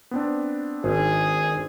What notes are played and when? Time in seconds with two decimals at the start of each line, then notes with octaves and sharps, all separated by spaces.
0.11 B3 C4 D4
0.84 G#1 G#4